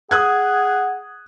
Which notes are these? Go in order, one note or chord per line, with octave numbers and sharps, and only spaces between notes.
G#4 F#5 D#6 F#6 G#6